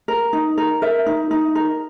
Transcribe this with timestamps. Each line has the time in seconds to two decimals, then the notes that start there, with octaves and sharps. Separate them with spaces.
0.08 A#4
0.33 D#4
0.58 A#4
0.82 A#4 E5
1.06 D#4
1.31 D#4
1.55 A#4